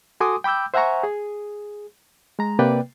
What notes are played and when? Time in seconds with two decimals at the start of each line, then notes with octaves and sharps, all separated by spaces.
0.20 F#4 A4 G#5 C6 D6 D#6
0.44 G5 B5 D6 E6 G6
0.74 C5 E5 F#5 G#5 A#5 C#6
1.03 G#4
2.39 G#3 A#5
2.59 C3 A#3 B4 D5 G5